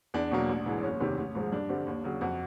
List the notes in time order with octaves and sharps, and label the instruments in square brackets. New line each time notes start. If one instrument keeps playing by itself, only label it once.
[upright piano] E2 D4
B2 F#3 A#3
A1
G#2 E3 G#3
F#1 C#4
E2 C3 D#3
A1
G#2 F3 G#3
G2 D4
D3 G3 C4
D#2
C#3 F#3
F2 F#4